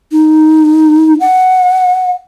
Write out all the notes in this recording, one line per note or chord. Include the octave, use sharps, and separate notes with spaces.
D#4
F#5